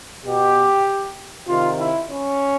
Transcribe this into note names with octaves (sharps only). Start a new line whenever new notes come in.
B2 G4
C3 D#3 F4
E4
C#4